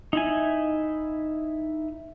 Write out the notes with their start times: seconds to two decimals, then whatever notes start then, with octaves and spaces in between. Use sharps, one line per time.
0.13 D#4 E4 G#5